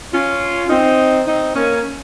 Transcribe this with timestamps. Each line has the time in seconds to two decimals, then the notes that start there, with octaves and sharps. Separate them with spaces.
0.13 C#4 F4
0.69 C4 D#4
1.27 C4 D#4
1.55 A#3 C#4